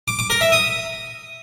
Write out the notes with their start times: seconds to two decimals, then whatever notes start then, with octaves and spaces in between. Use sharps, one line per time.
0.08 D6
0.19 D6
0.30 A#4
0.41 E5
0.52 D#6